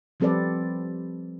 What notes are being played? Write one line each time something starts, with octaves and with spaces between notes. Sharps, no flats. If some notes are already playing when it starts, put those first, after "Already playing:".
F3 G3 C4 A4 B4 D5